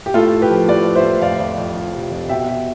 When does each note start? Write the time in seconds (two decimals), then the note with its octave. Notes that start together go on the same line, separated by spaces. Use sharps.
0.06 G4
0.14 A2 F4 A4
0.33 A2
0.41 G4 B4
0.50 F3
0.68 A2 B4 D5
0.87 F3
0.95 C5 E5
1.04 A2
1.22 F2 D5 F5
1.40 F2
1.58 F2
1.77 F3
1.95 C3
2.11 F2
2.29 B2 E5 G5
2.48 B2